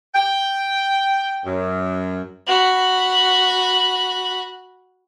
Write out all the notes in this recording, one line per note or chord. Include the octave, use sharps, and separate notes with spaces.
G5
F#2
F#4 B5